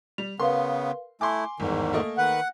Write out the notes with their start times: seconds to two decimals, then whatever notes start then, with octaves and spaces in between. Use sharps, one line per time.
0.18 G3 F7
0.40 C#3 B3 A#4 B4 F5 C6
1.21 A3 E4 G#5 C6 D6
1.60 G1 E2 G#2 D#3
1.93 A3 A#3 D#5
2.18 D#3 B4 F#5 F#6